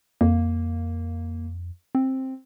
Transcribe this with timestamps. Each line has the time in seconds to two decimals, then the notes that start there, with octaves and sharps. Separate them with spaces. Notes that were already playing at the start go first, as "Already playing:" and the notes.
0.21 F2 A#3
1.95 C4